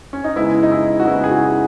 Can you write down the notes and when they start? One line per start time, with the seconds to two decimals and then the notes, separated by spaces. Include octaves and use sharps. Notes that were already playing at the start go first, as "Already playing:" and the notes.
0.13 C#4
0.24 D#4
0.36 C#3 G#3 B3 E4
0.63 D#4
0.72 E4
0.99 F#4
1.07 C#3 G#3 B3 E4
1.24 G#4
1.31 F#4